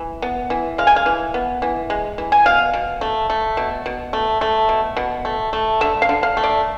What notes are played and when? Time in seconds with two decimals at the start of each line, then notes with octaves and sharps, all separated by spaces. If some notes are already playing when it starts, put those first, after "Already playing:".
Already playing: E3
0.22 B3
0.50 E3
0.78 G#3 F5
0.87 G#5
0.96 F5
1.06 E3
1.34 B3
1.62 E3
1.90 G#3
2.18 E3
2.32 G#5
2.46 B2 F5
2.74 B2
3.01 A3
3.30 A3
3.57 B2
3.86 B2
4.13 A3
4.41 A3
4.69 B2
4.97 B2
5.25 A3
5.53 A3
5.81 D3 E5
6.02 F5
6.09 D3
6.23 F5
6.37 A3
6.44 D5